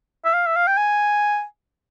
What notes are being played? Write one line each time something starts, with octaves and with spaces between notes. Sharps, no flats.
E5
F5
E5
F5
G5
G#5